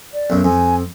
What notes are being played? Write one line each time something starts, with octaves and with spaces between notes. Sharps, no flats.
D5
B1 F#2
F2 G#5